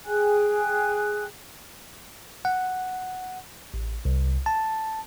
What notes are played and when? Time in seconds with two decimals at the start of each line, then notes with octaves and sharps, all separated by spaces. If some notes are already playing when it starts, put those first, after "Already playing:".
0.04 G#4 G5 G#5 F#6
2.45 F#5
3.74 A1
4.05 C2
4.46 A5